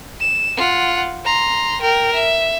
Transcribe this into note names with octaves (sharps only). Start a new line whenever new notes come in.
E7
F4 F#5
A#5 C6
A#4 G5
E5